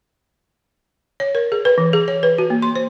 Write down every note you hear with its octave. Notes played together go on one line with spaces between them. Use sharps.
C#5
A#4
G#4
B4
E3
G#4
C#5
B4
F#4
A#3
C6
C5